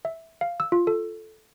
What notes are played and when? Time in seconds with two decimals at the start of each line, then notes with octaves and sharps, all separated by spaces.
0.05 E5
0.41 F5
0.60 E6
0.72 F4
0.87 A4